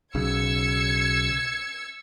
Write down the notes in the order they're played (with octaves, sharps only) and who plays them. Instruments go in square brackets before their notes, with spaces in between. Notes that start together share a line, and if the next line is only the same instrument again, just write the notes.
[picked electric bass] B1 C#3 [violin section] E6 G#6 C#7